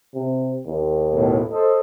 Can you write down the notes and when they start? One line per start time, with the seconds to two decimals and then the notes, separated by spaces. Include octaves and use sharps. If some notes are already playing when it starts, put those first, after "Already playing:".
0.14 C3
0.66 D#2
1.13 B1 A2
1.51 A4 C5 D#5